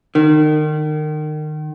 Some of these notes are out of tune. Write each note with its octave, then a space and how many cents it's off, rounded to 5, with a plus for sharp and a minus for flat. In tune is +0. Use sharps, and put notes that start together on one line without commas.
D#3 -30